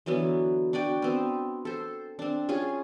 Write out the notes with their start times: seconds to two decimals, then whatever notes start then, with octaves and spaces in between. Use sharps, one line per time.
0.06 D3 E3 F#3 B3
0.73 D4 F#4 D5 G5
1.02 B3 C4
1.65 A4 C5
2.19 C4 D4
2.49 C#4 F4 G#4 G#5